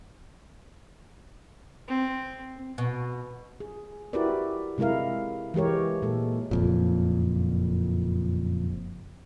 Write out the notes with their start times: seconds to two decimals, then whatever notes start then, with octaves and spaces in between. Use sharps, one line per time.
1.88 C4
2.78 B2
3.60 G#4
4.13 E4 F#4 G4 A#4 B4 D5
4.78 C3 G#3 E4 A#4 F5
5.54 E3 G#3 G4 A#4 C#5
6.02 A#2 G#3 A4
6.51 F#1 F2 A#2